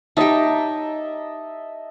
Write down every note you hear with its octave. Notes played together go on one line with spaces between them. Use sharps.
D#4 G4 D#5 E5 A5